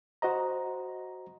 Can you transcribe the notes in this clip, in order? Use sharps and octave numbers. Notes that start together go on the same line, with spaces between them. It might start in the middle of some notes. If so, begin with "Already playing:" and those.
F#4 C5 D#5 A#5